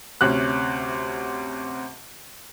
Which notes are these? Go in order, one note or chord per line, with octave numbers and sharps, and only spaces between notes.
D2 C3 C#4 F#6